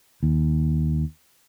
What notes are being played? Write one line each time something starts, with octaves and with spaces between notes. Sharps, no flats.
D#2